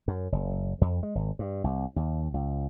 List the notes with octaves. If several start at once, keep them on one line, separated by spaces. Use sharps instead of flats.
F#2
F#1
F2
G#3
G#1
G2
C2
D#2
C#2